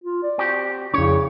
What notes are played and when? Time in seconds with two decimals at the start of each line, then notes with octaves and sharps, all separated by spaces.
0.04 F4
0.23 D5
0.38 C4 F#4 G4
0.94 F2 C#3 C#4 E4 C#5